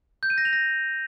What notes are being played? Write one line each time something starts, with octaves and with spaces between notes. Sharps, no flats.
G6
D#7
A#6
F7
A#6